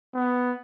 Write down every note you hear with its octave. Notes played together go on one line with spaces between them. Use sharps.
B3